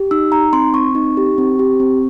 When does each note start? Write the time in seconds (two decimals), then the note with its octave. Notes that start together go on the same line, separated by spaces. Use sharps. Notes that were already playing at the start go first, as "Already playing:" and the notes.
Already playing: G4
0.11 D#4 E6
0.32 D#4 A#5
0.53 C4 C6
0.74 C4 C#6
0.95 D#4
1.17 G4
1.38 C4
1.59 G4
1.80 C4